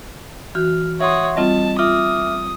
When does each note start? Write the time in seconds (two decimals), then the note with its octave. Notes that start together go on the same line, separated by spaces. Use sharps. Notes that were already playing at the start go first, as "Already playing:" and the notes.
0.55 E3 F#4 F6
1.01 C#5 E5 F#5 C6 D#6
1.37 G3 C4 F4 D#5 A5
1.79 F4 E5 D6 D#6 F6